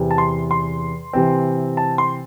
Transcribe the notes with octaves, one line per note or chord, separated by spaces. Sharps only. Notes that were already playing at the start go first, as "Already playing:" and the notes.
Already playing: E2 C3 E3
A5
C6
C6
C3 E3 C4
A5
C6